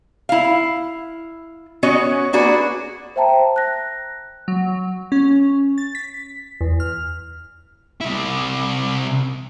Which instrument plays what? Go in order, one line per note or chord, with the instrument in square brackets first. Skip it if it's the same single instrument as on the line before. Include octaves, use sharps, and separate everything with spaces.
[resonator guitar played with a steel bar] E4 F5
B3 C#4 F#4 C#5 D#5
A#3 D4 F#4 G#4 B4
[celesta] C5 E5 G5 A5 A#5
F#6 A#6
[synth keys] F#3
C#4
A6
B6
E2
F6
[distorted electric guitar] C3 E4